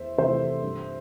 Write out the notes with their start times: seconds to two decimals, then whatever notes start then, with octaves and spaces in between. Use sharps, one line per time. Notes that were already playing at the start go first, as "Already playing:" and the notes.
Already playing: E2 C5 E5
0.18 C3 E3 A3 C5 E5
0.63 G2